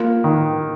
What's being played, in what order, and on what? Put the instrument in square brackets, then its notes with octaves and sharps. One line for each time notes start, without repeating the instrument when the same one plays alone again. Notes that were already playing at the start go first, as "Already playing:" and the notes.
Already playing: [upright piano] A#3 [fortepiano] F4
[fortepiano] D#3